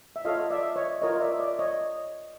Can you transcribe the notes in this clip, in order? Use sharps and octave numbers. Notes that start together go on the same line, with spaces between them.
E5
F4 A4 C#5 D#5 F5
D5 E5
C#5 D#5
F4 A#4 C#5 D#5
D5 E5
D5
C#5 D#5